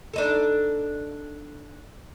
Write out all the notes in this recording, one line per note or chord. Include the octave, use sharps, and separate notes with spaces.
D4 D#4 A4